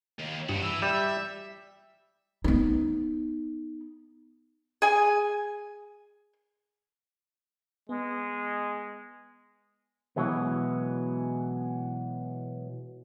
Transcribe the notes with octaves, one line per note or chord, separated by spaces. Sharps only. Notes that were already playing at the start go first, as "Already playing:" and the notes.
D#2
G2 G3 F#4
E3 E6
G3 E5
B3 D#4
G#4 G#5
G#3 B3
B2 E3 F#3 G#3 B3